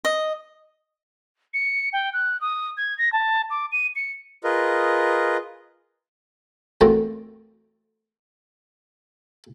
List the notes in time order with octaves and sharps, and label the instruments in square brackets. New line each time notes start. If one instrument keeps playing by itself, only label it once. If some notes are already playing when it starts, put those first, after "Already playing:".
[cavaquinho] D#5
[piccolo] C#7
G5
F#6
D#6
G#6
A#6
A5
D6
D#7
C#7
[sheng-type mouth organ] F4 G#4 A#4 B4 D#5
[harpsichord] E2 A#2 A3 C4 F#4 A#5